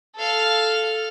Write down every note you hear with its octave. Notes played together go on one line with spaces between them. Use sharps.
A4 F5